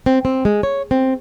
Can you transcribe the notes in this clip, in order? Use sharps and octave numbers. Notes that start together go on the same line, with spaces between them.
C4
C4
G#3
C#5
C4